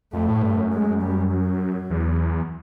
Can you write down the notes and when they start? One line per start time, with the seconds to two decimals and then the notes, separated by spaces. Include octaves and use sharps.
0.13 F2 A3
0.28 A2
0.42 G2
0.57 F#2
0.72 G#3
1.02 G3
1.31 F#3
1.90 E2